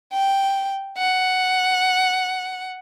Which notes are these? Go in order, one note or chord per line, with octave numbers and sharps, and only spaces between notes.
G5
F#5